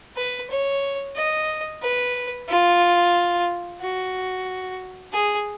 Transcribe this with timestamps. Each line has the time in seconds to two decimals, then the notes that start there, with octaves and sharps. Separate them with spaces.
0.17 B4
0.50 C#5
1.16 D#5
1.82 B4
2.49 F4
3.81 F#4
5.13 G#4